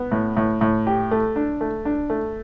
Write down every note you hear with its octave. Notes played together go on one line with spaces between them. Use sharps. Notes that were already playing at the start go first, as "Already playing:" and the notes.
Already playing: B3
A2
A2
A2
G4
A3
D4
A3
D4
A3